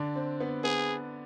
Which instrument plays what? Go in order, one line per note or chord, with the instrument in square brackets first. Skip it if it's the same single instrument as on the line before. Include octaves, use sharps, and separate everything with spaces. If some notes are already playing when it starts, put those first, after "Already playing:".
Already playing: [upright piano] D3 D4
C4
B3
[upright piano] B3 [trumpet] G#4